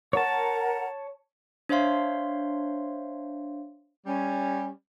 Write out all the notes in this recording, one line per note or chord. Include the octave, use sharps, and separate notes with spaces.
A#4 C#5 F#5 A5 A#5
D4 C5 C#5 E5 F5 C6
G3 C#4